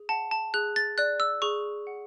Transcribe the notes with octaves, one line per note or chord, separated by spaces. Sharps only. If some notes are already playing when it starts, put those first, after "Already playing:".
Already playing: G#4
F#5 A5
A5
G#4 F#6
A6
D5 F#6
E6
G#4 C#6
F#5